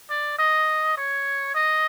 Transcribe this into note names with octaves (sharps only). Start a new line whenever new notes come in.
D5
D#5
C#5
D#5